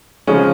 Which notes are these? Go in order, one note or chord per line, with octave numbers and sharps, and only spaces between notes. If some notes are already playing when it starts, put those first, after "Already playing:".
C#3 F3 G#3 C#4